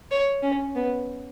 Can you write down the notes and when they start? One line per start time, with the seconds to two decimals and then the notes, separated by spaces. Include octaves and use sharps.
0.11 C#5
0.43 C#4
0.76 B3